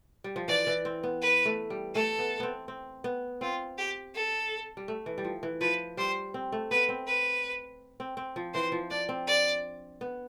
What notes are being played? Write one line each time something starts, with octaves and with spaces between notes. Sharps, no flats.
G3
F3
E3 D5
E3
C4
B3
B4
A3
G3
A3 A4
B3
B3 C4
C4
B3
C4 F4
G4
A4
G3
A3
E3
G3
F3
E3
F3 B4
G3 C5
C4
A3
B3 B4
C4
B4
C4
C4
F3
E3 C5
F3
D4 D5
C4
D5
B3